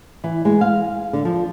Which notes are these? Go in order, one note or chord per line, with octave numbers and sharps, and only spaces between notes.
E3
G#3
F5
D3
F3